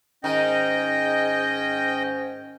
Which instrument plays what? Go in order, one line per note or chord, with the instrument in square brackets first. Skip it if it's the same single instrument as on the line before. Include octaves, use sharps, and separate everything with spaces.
[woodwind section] G#2 C#4 [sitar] D#3 [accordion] D#5 G5